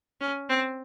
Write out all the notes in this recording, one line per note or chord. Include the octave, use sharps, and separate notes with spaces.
C#4
C4